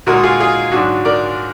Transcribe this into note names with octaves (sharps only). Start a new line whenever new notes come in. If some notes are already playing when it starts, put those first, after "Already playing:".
A#2 G#3 D#4 F#4 A#4
F4 G#4
F4 G#4
G#2 F#3 D4 F#4
A#4 D5